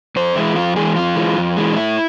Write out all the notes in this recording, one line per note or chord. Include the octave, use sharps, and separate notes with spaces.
F2 C5
E3 G#3 E4
F2 F4
E3 G#3 G#4
F2 F4
E3 G#3
F2
E3 G#3
D4
A2 E4